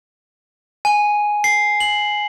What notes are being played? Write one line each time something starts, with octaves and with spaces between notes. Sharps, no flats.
G#5
C7
F#7